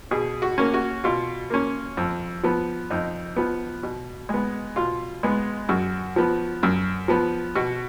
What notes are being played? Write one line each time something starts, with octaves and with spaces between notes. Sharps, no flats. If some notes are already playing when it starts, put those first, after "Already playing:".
B2 G#4
F#4
A#3 C#4
F#4
B2 F4
A#3 C#4
F2
F3 B3
F2 D#4
F3 B3
B2
G#3 B3
B2 F4
G#3 B3
F#2 F#4
F3 B3
F#2
F3 B3
B2 F#4